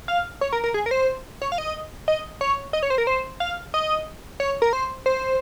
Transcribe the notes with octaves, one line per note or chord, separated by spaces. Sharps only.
F5
C#5
A#4
A#4
G#4
A#4
C5
C#5
F5
D#5
D#5
C#5
D#5
C#5
C5
A#4
C5
F5
D#5
C#5
A#4
C5
C5